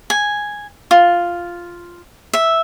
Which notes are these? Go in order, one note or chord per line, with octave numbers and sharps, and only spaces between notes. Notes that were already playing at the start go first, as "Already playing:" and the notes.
G#5
F4
E5